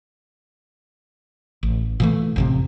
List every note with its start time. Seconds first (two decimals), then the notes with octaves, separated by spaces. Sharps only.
1.63 A1
2.00 A#2 E3 A3
2.36 A1 F2 C3